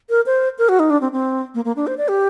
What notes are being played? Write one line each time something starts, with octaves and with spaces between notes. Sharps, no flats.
A#4
C5
A#4
F#4
D#4
D4
C4
C4
A#3
A#3
D4
C5
D5
G4